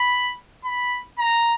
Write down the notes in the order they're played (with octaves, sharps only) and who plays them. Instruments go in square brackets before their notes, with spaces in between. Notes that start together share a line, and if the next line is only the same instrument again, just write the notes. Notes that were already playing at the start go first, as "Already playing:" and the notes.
Already playing: [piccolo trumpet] B5
B5
A#5